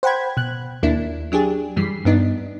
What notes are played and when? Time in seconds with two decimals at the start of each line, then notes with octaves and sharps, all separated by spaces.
0.03 C5 F#5 G5 B5 G#6
0.37 B2 F#6
0.83 D#2 A#3 D4 E4
1.32 F#3 D4 G4 G#4
1.76 F#2 E3 G3 B6 C7
2.05 G2 B3 D4 D#4